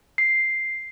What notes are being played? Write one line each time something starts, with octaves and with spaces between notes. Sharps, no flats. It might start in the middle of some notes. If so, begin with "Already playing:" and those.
C7